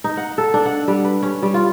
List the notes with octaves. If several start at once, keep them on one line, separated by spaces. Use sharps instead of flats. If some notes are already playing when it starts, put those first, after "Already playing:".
D#4
F#5
A4
D4
F#5
G3
B4
C#4
G3
F4